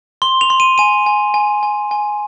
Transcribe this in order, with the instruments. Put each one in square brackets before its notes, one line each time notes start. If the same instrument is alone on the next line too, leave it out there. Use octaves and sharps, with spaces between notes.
[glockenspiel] C6 G7
F7
C6
D#7
G#5 D#7
G#5
G#5
G#5
G#5